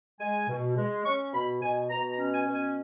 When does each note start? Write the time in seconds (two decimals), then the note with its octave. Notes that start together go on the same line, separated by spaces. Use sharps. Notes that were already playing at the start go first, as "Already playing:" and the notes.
0.20 G#3 G#5
0.49 B2
0.77 G#3
1.05 C#4 C#6
1.34 B2 B5
1.62 B2 G#5
1.90 B2 A#5
2.12 A#5
2.18 C#4
2.34 G#5
2.47 B2
2.54 G#5